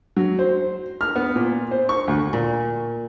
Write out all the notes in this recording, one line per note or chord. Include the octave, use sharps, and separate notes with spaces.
F#3
C5
F6
B3
A#2
C5
C#6
D2
A#2